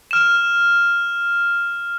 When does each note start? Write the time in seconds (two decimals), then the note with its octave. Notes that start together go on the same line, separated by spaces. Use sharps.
0.11 F6 E7